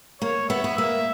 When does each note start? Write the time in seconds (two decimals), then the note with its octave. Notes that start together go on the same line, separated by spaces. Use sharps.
0.22 A#3 C#5
0.50 B3 E5
0.64 B3
0.78 A#3 E5